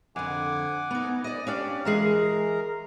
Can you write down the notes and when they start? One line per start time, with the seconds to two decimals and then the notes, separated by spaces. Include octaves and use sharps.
0.16 F2 D3 F#5 G#5 D6
0.91 B3 D#4
1.24 D5 D#5
1.47 C#4 D4 G4 D5 F5
1.85 E3 G#3 G#4 A#4 A#5